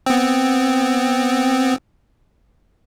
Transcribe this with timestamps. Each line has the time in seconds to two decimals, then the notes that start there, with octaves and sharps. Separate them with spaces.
0.06 B3 C4